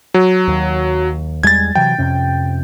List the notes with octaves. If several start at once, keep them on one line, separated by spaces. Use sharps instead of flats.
F#3
D#2
E2 G3 G#3 G#6 A6
C3 E3 F#3 G5
F2 C3 C#4